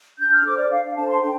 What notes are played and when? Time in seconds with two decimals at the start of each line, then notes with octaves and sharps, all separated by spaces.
0.18 D4 G6
0.32 F6
0.45 A4 C5 D6
0.57 D5
0.70 D4 F5
0.83 F5
0.96 A4 C5 A5
1.09 C6
1.22 D4 G5